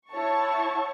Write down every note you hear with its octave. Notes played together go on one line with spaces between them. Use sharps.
E4 C#5 F#5 A5 C#6